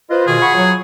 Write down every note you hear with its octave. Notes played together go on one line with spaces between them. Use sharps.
F4 B4 C5 D#5
B2 D#3 G#4
F#5 B5 C#6
F#3 C#5